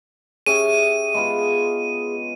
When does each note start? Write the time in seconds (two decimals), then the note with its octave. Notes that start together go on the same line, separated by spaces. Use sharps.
0.46 C#4 G4 G#4 E5 D#7
1.14 G#3 B3 F4